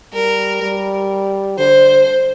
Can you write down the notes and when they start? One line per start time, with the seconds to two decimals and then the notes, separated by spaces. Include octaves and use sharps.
0.13 G3 A#4
0.62 G3
1.58 D3 C5